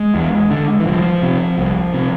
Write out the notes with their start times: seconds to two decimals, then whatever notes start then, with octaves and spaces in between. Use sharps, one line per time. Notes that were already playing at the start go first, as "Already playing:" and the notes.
Already playing: G#3
0.15 E2
0.51 D3
0.80 E3
0.86 C2 F3
1.23 C3
1.58 C2
1.94 C3